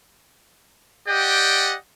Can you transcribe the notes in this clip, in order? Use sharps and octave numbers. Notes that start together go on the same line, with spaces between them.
G4 D5 D#5 F#5 G5